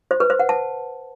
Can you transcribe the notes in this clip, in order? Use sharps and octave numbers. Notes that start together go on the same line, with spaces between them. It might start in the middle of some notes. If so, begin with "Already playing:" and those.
C5
B4
C5
F#5
A5